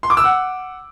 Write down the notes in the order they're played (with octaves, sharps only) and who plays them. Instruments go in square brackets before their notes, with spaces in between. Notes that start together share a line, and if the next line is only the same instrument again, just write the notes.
[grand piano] C6
D6
E6
F#5